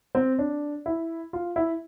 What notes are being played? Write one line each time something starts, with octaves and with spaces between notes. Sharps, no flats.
C4
D4
E4
F4
E4